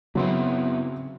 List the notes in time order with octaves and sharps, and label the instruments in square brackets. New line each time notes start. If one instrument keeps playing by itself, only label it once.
[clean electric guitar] F#2 B3 E4 [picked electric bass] C#3 C4 [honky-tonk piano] F#3 C6